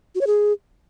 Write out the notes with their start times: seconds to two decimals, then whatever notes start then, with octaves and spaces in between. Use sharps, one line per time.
0.15 F#4
0.21 C#5
0.27 G#4